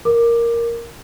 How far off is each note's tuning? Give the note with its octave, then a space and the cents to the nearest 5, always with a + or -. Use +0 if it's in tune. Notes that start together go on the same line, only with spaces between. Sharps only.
A#4 +0 D6 +15